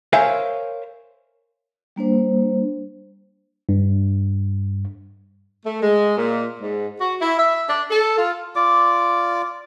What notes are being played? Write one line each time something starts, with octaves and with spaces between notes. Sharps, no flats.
A#4 C5 C#5 E5 F5 G#5
G3 A#3 D4 C5
G2
A3
G#3
A#2
G#2
F#4
E4
E5
D4
A4
F4
F4 D5 D6